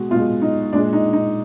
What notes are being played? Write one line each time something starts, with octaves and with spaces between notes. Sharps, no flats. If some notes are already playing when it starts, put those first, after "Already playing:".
Already playing: B2 G#3 F#4
B2 G#3 F4
D#4
A#2 G#3 D4
D#4
D#4